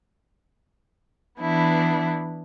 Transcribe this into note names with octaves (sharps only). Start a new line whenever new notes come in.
E3 B3 D4 E4